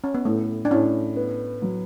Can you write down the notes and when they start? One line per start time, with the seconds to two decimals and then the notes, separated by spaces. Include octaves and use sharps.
0.04 C#4
0.15 B3
0.25 A2 A3
0.65 D4
0.71 A2 C#4
1.16 B3
1.62 F#3